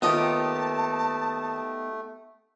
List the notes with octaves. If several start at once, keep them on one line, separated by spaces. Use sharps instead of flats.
D#2 A3 B3 D#4 F4 G4 D#5 A5